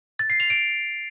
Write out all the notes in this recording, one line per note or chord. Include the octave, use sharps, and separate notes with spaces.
A6
C7
F7
D7